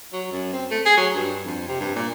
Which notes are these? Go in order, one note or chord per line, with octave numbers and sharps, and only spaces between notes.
F#3
F#2
C4
A3
G#4
F#3
G2
F2
C3
G2
A#2